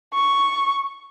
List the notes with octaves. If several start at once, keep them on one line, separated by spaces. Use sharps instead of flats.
C#6